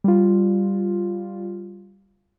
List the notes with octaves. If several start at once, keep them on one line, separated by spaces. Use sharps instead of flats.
G3 F4